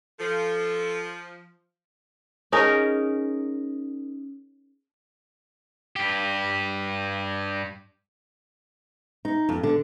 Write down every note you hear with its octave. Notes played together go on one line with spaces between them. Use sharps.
F3 A4
C#4 D#4 G#4 A#4
G2 G4
D#4
F2
D3